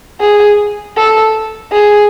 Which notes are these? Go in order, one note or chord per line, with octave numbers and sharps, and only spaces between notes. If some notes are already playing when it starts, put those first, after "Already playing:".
G#4
A4
G#4